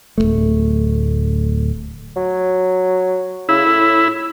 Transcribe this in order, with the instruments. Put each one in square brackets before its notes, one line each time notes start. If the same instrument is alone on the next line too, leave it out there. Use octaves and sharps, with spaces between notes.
[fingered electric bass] D1 G#1 A3
[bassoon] F#3
[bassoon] C#3 [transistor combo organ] E4
[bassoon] A2